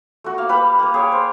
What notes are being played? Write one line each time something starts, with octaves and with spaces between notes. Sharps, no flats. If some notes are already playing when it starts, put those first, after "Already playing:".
A3 F#4
A#3 F5
G3 B4 B5
A#3 B4
G#4 C#5 G5
C5